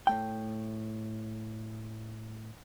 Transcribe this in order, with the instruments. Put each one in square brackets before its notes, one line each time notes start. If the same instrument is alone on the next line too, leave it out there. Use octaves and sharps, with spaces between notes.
[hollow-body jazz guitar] A2 A3 G5